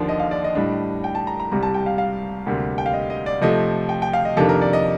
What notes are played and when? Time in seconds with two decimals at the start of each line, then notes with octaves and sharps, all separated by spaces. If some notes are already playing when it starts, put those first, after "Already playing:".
Already playing: D#2 D3 F3 A#3 D4 D5
0.09 D#5
0.20 F5
0.31 D5
0.44 D#5
0.55 A2 G3 D4
1.04 G5
1.15 A5
1.27 A#5
1.40 A#5
1.52 C2 C3 G3 A#5
1.63 A5
1.74 G5
1.86 F5
1.98 F5
2.46 D2 C3 G3 A#3
2.78 G5
2.86 F5
2.94 D#5
3.10 D#5
3.26 D5
3.41 C3 F3 A3 D#5
3.89 G5
4.02 G5
4.13 F5
4.25 D#5
4.37 F2 C3 D#3 A#3 D4 A4
4.49 A#4
4.62 D5
4.73 D#5